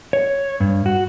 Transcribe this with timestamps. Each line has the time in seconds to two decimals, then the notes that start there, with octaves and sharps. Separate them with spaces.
0.13 C#5
0.60 G2
0.86 F#4